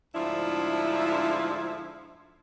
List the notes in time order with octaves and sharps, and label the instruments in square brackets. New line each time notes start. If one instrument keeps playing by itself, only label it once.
[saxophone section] D2 G#2 F3 D4 E4 E5